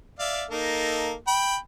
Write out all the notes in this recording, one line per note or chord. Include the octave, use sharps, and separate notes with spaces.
D5 E5 F5
A#3 D#4 A4
G5 B5